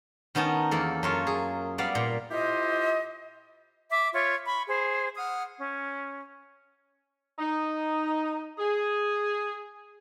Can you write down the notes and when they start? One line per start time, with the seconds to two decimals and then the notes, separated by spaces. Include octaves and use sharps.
0.35 D#3 B3 C#4 D#4 A5
0.71 E2 A#3 A4
1.03 F#2 F4 C#5
1.27 G#4
1.78 G3 B3 D5 F5
1.95 A#2
2.31 E4 F4 G4 C5 D#5
3.91 E5 D6
4.12 F4 C#5 E5
4.47 B5 C#6
4.68 G#4 C5
5.16 F#5 D#6 F6
5.57 C#4
7.38 D#4
8.59 G#4